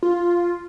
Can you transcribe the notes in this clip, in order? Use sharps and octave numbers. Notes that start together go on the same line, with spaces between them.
F4